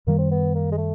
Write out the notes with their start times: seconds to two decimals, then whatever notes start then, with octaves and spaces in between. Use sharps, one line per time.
0.07 F#2 D#3 G3 A#3
0.19 C4
0.31 B3
0.55 A#3
0.72 G#3
0.77 A3